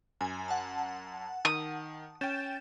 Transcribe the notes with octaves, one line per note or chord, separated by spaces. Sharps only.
F#2 G#5
F#5 A5
D#3 D#6
C#4 G5 G6 A6 E7